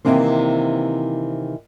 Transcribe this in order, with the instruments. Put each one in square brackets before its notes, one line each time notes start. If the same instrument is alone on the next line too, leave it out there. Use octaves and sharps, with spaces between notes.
[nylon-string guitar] C3 D#3 E3 A#3 C4